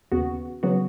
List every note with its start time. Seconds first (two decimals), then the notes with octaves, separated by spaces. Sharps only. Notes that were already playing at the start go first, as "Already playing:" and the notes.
0.12 D#2 C#3 B3 F#4
0.63 C#3 F#3 B3 F#4